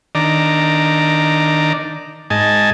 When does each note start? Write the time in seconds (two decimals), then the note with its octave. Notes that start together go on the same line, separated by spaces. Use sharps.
0.15 D#3 D4 D5 A#5
2.30 G#2 D#5 G#5 A5